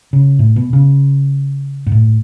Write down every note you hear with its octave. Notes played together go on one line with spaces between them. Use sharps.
C#3
A2
B2
C#3
G#2
A2